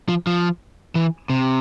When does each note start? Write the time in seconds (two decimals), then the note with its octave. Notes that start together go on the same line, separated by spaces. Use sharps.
0.08 F3
0.27 F3
0.95 E3
1.30 C3